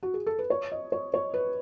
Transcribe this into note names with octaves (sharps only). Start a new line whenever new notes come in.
F#4
G#4
A4
B4
C#5
D#5
C#5
C#5
B4